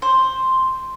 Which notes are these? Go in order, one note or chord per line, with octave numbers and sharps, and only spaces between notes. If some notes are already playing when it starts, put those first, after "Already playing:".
C5